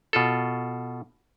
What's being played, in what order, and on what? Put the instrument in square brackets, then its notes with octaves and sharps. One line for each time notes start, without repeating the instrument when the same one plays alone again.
[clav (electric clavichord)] B2 F4 A4